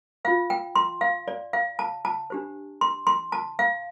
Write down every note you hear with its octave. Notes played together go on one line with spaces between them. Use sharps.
F4 C5 F5
G5
C6
F5
D5
F5
A5
A5
D4 G4 C5
C6
C6
A5
F5